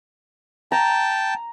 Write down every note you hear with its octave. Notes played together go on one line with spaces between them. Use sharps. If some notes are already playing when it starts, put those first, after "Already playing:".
G5 A5 A#5